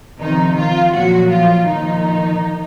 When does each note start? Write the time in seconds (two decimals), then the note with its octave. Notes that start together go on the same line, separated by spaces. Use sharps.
0.20 C3 D#3 F3 D#4
0.57 F3 F4
0.94 A#2 F3 F#3 F#4
1.31 F3 F4
1.67 A#2 D#3 F3 D#4